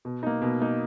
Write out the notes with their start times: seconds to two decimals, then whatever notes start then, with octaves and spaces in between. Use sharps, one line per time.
0.05 B2
0.23 A#3 D#4
0.42 B2
0.61 A#3 D#4